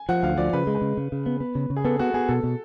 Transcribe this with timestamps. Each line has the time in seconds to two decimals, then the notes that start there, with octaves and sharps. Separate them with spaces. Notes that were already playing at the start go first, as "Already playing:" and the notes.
Already playing: G#5
0.09 F3 F#5
0.23 D2 F5
0.38 F3 D5
0.53 C#3 B4
0.67 G#3
0.75 B4
0.82 C#3
0.97 C#3
1.12 C#3
1.26 B3
1.40 B3
1.55 C#3
1.70 C#3
1.76 G#4
1.85 B3 A4
1.99 B3 F#4
2.14 B3 G#4
2.28 B2 A4
2.44 B2